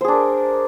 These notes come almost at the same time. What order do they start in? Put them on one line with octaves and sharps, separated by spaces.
C5 G#4 D4 A#4